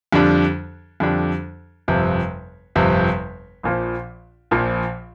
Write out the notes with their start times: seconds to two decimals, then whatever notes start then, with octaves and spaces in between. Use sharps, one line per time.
0.12 F2 D3 G3 D4
1.00 F2 D3 G3 D4
1.88 G1 F2 C3
2.75 G1 F2 C3
3.63 A#1 A#2 F3
4.51 A#1 A#2 F3